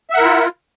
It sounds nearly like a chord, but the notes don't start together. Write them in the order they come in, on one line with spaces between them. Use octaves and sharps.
E5 F#5 A#4 E4 F4